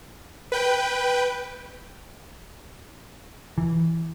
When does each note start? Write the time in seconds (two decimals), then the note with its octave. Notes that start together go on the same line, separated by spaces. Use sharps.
0.52 B4 G5
3.58 E3